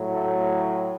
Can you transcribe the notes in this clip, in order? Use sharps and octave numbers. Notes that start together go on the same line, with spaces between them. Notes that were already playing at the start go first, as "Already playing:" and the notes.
Already playing: A2 F#3
A3